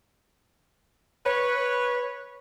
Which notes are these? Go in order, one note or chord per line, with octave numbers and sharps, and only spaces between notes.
B4 C#5